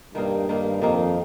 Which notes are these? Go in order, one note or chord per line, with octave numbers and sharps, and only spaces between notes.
G2 D#3 A#3 D#4 A#4
G2 D#3 A#3 D#4 A#4
F2 D#3 A#3 D#4 A#4